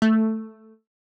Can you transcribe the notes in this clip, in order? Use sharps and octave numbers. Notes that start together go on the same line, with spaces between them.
A3